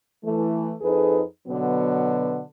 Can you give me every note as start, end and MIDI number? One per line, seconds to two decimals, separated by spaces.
0.25 0.73 52
0.25 0.73 57
0.82 1.21 41
0.82 1.21 63
0.82 1.21 68
0.82 1.21 69
0.82 1.21 71
1.47 2.40 47
1.47 2.40 50
1.47 2.40 54
1.47 2.40 59